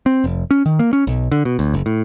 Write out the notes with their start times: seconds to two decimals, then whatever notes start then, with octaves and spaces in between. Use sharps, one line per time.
0.06 C4
0.24 F1
0.51 C#4
0.66 D#3
0.79 A#3
0.93 C#4
1.07 B1
1.32 D3
1.45 B2
1.59 D2
1.74 F#1
1.86 A2